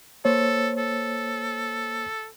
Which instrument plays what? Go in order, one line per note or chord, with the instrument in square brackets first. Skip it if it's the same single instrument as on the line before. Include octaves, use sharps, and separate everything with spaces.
[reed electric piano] A#3 C5 C#5 [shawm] A4
[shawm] A4